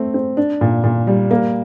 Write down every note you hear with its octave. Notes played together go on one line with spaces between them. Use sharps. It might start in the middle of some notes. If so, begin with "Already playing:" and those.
Already playing: A3 C4
C4
D4
A#2
A#2
G3
A#3